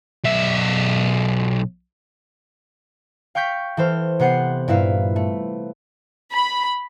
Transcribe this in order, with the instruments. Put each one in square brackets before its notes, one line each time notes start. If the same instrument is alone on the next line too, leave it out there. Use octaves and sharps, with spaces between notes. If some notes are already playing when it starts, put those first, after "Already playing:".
[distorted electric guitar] B1 E5
[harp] F5 G5 C#6 G6 B6
E3 A4 C5 F6
C3 B3 C5 F#5 C7
G2 A#2 E4 B4 F5
A3
[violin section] B5